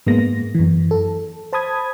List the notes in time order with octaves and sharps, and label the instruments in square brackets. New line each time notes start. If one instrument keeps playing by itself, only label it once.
[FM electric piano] G#2 G#3 A#3 B3 A#6
F#2 E3
A4
C5 A5 B5 D#6 G#6